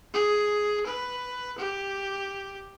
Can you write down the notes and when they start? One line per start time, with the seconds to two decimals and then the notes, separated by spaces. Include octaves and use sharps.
0.14 G#4
0.86 B4
1.58 G4